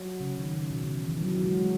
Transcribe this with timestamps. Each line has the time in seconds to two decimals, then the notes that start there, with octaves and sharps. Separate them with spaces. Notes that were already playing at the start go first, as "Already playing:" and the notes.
Already playing: F#3
0.20 C#3
0.37 D#3
0.53 C#3
0.70 B2
0.83 C#3
0.96 E3
1.04 D#3
1.08 E3
1.21 F#3
1.37 F#3
1.45 G#3